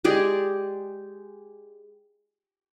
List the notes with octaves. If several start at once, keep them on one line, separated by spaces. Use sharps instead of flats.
G#3 G4 G#4 D5